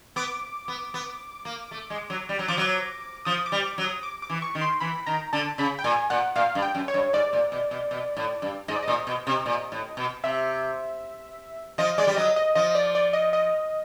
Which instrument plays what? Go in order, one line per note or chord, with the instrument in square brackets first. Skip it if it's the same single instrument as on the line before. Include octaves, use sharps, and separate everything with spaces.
[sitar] B3 [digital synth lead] D6
[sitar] B3
B3
A#3
A3
G#3
F#3
G3
F#3
[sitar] F3 [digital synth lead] D6
[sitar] F#3
[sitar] F3 [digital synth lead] D#6
[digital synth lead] D6
[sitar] G3
[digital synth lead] D6
[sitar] F#3
[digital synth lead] D#6
D6
D6
[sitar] E3
[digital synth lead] C#6
[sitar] D#3
[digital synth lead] C6
[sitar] E3 [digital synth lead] B5
[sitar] D#3 [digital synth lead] A#5
[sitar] D3 [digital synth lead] A5
[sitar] C#3 [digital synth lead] B5
[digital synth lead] G5
[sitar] A#2 [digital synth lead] G#5
[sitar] A#2 [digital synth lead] F#5
[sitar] A#2 [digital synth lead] F5
[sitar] G2
[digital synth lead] G5
[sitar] F#2
[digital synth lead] C#5
[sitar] G2
[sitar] G#2 [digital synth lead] D5
[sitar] A#2
B2
B2
B2
A2
G2
[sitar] G#2 [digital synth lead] D#5
[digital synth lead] D5
[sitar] A#2 [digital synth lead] D#5
[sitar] B2
C3
A#2
A2
B2
[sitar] C3 [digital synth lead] E5
[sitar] F3 [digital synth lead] D#5
[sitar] G#3 [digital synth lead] D5
[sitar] G3
[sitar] F#3 [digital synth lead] D#5
[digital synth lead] D#5
[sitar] F3 [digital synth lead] D#5
[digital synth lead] D5
D5
D#5
D#5